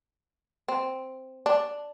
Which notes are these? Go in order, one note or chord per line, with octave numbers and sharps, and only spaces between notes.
C4
D4